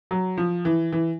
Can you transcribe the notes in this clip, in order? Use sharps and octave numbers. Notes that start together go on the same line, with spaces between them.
F#3
F3
E3
E3